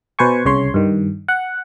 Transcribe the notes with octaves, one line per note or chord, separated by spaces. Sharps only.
B2 B4 C5 G#5 C#6
C2 C#3 C#5 C6
G2 D#3
F#5